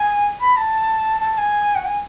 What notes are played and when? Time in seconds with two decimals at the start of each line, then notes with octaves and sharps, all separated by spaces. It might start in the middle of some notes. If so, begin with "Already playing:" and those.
Already playing: G#5
0.41 B5
0.57 A5
1.21 A5
1.38 G#5
1.76 F#5
1.85 G#5